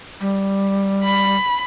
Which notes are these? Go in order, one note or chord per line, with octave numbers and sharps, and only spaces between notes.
G3
B5